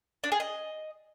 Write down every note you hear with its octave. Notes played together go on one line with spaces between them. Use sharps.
D4
G#4
D#5